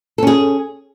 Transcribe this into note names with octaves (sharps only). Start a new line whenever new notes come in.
C#4 G#4 A4